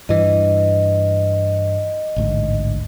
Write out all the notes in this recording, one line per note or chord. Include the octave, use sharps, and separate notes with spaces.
G2 E3 D#5
A1 D2 G#2